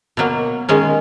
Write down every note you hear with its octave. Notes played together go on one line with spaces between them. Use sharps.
B2 F#3 A#3
D#3 G#3 C#4